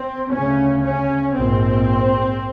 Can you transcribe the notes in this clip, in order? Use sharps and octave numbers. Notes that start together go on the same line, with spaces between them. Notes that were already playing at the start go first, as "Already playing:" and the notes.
Already playing: C4
D2 C#3 C#4
C#4
A#1 G#2 C4